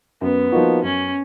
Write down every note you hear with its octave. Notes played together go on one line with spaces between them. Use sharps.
F#2 B3
F3 A#3 D#4 F#4
F#2 C#4